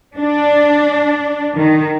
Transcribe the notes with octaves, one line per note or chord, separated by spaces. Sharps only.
D4
D#3